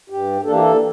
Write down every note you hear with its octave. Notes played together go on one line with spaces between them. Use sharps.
G2 G4
E3 A#3 D4 A4
G4
A4